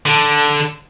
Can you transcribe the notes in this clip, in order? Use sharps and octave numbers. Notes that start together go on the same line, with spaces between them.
D3